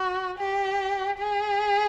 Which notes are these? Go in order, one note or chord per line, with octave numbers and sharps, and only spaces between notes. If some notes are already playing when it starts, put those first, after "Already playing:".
Already playing: F#4
G4
G#4